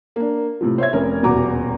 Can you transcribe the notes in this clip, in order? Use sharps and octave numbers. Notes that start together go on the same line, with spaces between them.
A#3 D4
A2 C3 F3
C5 C#5 E5 G#6
F1 C#4 A#4
D#1 E2 B2 F#4 A#5 D6